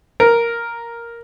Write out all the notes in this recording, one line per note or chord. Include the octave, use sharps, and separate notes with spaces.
A#4